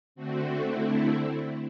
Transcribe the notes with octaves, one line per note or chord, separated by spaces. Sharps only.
D3 A3 C4 F#4
E4